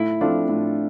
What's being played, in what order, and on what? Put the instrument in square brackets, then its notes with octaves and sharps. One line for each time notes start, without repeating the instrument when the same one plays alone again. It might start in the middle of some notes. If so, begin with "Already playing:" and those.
Already playing: [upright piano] A2 [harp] E4
[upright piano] F3 C4 F4 A4 [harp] D4
[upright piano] A2